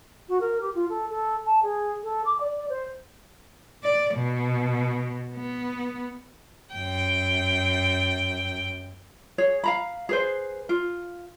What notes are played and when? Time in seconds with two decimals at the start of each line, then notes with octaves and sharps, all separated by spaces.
0.28 F#4
0.40 A#4
0.60 G4
0.74 F4
0.89 A4
1.09 A4
1.46 A5
1.62 G#4
2.03 A4
2.25 D6
2.40 D5
2.69 C5
3.83 D5
4.15 B2
5.37 B3
6.74 F#2 G5
9.38 G#4 C#5
9.64 F5 A#5 B5
10.09 G#4 B4 C5
10.69 F4